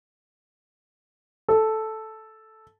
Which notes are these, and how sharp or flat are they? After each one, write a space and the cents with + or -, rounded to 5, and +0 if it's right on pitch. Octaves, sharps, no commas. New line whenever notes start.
A4 -5